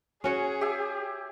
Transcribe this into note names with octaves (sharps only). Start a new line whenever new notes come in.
C#4 F#4 G#4 C#5
G4 E5 G#5